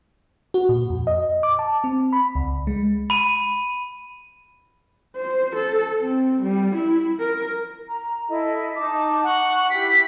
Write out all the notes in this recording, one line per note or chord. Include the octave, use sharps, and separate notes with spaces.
F#4
A#2
F2
D#5
D6
A5
C4
B5
C#2
G#3
B5 D#7
C5
A4
C4
G3
E4
A#4
A#5
E4 A4 D#5
D#4 A5 D6
F#5 C#6
E4 G4 B6